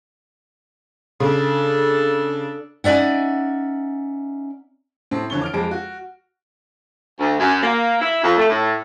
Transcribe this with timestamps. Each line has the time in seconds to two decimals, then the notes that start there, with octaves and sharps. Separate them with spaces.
1.20 C#3 D4 A4
2.84 C#4 D#4 D5 E5 F#5
5.11 A2 C4 A5
5.30 F2 D3 E3 C#5 C#6 G7
5.41 D6 F6 D7
5.54 F2 G#3 D7
5.71 F#4
7.20 D2
7.39 F#2
7.63 A#3
8.01 E4
8.24 F2
8.37 A3
8.50 A2